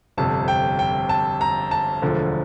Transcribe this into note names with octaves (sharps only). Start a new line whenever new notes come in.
G1 F2 C3 A5
G5
G5
A5
A#5
A5
E1 D2 D3 F3